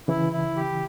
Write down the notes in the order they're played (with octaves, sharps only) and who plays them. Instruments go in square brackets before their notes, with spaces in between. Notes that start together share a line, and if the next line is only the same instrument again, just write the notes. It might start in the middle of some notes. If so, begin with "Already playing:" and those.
[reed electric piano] C#3 E3 [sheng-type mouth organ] E4
[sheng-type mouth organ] E4
G4